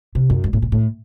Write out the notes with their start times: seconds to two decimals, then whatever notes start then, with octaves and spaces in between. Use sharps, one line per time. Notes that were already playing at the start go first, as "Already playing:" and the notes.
0.15 C3
0.30 F#2
0.44 G2
0.53 A2
0.62 A#2
0.72 A2